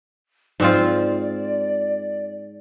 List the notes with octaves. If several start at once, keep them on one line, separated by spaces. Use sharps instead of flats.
G#2 C4 F4 D5